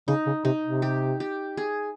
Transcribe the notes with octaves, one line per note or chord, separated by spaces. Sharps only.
C#3 D#4
C#3
C3 D#4
C3
G4
G4
G#4